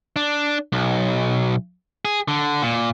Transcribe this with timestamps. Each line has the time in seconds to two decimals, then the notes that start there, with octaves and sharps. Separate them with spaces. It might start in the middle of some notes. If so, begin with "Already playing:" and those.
0.16 D4
0.72 B1
2.05 G#4
2.28 D3
2.62 A#2